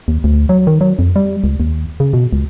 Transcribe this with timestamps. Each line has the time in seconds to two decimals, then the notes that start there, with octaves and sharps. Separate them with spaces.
0.08 D#2
0.24 D2
0.49 F#3
0.67 D#3
0.81 F#3
0.99 F2
1.16 G3
1.44 C#2
1.60 D#2
2.00 C#3
2.13 B2
2.33 C#2